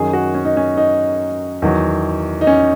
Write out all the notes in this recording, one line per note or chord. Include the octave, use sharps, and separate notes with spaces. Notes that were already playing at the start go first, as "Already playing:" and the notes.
Already playing: F#2 D#3 F#3 G#4
F#4
C#4
D#4
C#4
D#4
E2 D#3 F#3
D#4
C#4